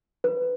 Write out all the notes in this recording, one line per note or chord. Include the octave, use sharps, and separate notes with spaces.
B4